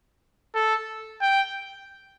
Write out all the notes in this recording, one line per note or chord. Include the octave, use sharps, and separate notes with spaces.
A4
G5